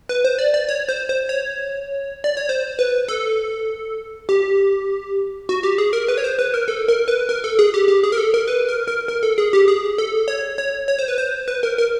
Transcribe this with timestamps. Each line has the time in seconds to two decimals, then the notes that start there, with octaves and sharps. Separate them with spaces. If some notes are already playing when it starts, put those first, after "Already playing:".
0.09 B4
0.25 C5
0.39 D5
0.54 D5
0.69 C#5
0.89 C5
1.09 C5
1.29 C#5
2.24 D5
2.37 C#5
2.49 C5
2.79 B4
3.08 A4
4.29 G4
5.49 F#4
5.63 G4
5.78 G#4
5.93 A#4
6.08 B4
6.18 C#5
6.24 C5
6.39 B4
6.54 A#4
6.68 A4
6.88 A#4
7.08 B4
7.29 A#4
7.44 A4
7.59 G#4
7.74 G4
7.88 G4
8.03 G#4
8.12 A#4
8.18 A4
8.34 A#4
8.48 B4
8.69 A#4
8.88 A#4
9.08 A#4
9.23 A4
9.38 G#4
9.53 G4
9.68 G#4
9.98 A4
10.28 C#5
10.58 C#5
10.88 C#5
10.99 C5
11.08 B4
11.18 C5
11.48 B4
11.63 A#4
11.78 A#4